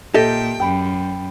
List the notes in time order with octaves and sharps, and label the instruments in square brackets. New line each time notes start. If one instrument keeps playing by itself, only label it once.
[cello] A#2 G5 [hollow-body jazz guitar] G4 D#5 E5 [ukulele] A4
[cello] F#2 [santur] G5 B5